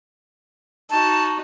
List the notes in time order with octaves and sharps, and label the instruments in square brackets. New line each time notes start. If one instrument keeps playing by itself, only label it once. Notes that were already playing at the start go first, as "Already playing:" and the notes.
[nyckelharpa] D#4 F#4 [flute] A5